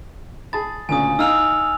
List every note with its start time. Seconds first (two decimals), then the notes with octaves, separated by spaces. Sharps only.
0.53 G#4 A5 B5 A6
0.89 D2 A#2 C#3 G#5 D#6
1.19 D#4 F5 G#5 E6 F6 F7